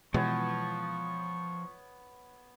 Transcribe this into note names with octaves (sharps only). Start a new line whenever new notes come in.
B2 E3 F3 G#3 B3 C#5 C#6